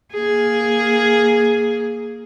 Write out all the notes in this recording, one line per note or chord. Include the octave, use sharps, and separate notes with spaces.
A#3 G#4